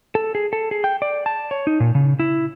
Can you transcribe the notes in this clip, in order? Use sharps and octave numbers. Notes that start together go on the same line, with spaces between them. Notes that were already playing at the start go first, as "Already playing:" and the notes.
A4
G#4
A4
G#4
G5
D5
A5
C#5
D#4
A#2
C#3
E4